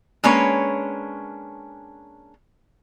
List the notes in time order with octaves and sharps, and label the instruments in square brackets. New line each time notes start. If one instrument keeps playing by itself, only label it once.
[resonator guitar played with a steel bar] G#3 A#3 C#4 D4 B4 C#5